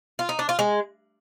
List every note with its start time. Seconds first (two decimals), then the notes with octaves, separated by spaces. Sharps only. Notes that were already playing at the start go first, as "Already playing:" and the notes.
0.19 F4
0.29 D#4
0.39 D4
0.49 F4
0.59 G#3